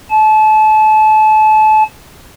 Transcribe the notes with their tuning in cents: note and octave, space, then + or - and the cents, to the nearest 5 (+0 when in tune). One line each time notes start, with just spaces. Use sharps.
A5 -30